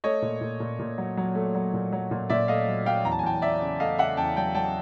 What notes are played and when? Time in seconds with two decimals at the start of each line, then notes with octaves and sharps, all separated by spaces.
0.04 A3 C#5 D#5
0.22 A#2
0.41 A#2
0.60 A#2
0.79 A#2
0.98 F#3
1.17 F#3
1.35 A3
1.55 F#3
1.74 A#2
1.92 F#3
2.11 A#2
2.29 A#2 D5 E5
2.48 A3 D#5 F5
2.68 F#3
2.86 F#3 F5 G5
3.04 E2 A#5
3.12 A5
3.19 G#5
3.23 E2 G5 A5
3.42 F#3 D5 E5
3.61 C#3
3.80 A3 D#5 F5
3.98 C#3 E5 F#5
4.17 E2 G5 A5
4.36 F#3 G5 A5
4.55 F#3 G5 A5